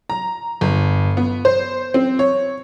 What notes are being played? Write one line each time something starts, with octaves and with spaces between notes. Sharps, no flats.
A#5
G1
B3
C5
C4
C#5